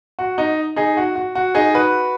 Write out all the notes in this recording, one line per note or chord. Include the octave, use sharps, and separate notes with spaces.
F#4
D#4
D#4 G#4
F#4
F#4
F#4
D#4 G#4
F#4 B4